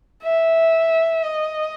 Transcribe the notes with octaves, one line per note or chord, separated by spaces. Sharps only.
E5
D#5